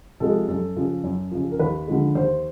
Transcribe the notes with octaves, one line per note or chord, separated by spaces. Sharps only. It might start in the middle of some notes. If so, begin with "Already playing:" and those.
C3 F3 G#3 A4
F#2 A4
C#3 F3
F#2
C#3 F3
A#4
D#2 B4
D3 F3 G#3
D#2 C5